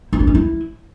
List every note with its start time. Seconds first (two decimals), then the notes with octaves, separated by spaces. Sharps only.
0.13 E4
0.20 D4
0.27 C#4
0.35 E4